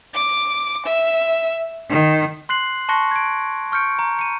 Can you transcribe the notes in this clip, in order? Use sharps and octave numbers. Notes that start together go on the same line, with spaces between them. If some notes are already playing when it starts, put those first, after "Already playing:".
D6
E5
D#3
C6 F#6 C7 F#7
A5 C6 C#6 F#6 A#6 C#7
G#6 D7
C#6 F6 G6 C#7 D7
A#5
C#7 D#7